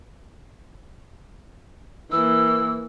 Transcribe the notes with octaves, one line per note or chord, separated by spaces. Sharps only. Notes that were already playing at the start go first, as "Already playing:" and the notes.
E3 A#3 E6